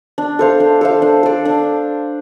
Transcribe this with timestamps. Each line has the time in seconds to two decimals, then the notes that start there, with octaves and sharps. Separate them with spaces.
0.18 D4
0.39 A4 C5 F5
0.60 D4
0.81 A4 C5 F5
1.02 D4
1.23 A4 D5
1.45 D4